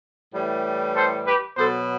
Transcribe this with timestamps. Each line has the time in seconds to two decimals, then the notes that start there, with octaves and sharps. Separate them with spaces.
0.34 A2 E3 G3
0.95 A4 C5
1.26 G4 B4
1.57 B2 F#3 A4 C5